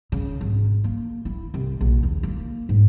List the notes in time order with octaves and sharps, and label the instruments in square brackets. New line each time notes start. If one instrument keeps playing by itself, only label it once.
[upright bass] C#3
G#1
A#3
E4
C2
A#1
D#2
A#3
G#2